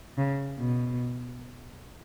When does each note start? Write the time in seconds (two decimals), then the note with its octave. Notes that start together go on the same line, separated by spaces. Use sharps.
0.17 C#3
0.58 B2